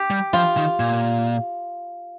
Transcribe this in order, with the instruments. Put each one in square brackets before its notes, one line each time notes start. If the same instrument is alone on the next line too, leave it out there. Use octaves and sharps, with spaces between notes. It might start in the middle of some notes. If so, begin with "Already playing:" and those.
Already playing: [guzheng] G4
[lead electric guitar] G3
[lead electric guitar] F3 [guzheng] F4
[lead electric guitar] D#3
A#2